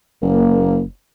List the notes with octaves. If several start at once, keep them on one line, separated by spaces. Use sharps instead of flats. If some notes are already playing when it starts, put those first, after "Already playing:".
F#1 A#3